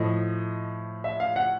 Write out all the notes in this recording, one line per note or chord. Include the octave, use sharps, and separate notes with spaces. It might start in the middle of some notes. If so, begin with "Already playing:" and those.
Already playing: A2 F3 D#5
E5
F5
F#5